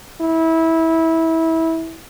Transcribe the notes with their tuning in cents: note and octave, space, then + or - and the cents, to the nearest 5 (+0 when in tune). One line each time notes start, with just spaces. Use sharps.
E4 -20